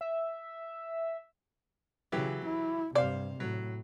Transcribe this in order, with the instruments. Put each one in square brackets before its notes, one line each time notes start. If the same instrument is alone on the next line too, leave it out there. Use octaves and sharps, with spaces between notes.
[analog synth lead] E5
[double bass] C#3 [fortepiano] E3 F#3 G4
[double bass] E4
[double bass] G2 C3 [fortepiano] C5 F5 [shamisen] D5
[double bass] A2 [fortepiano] F#3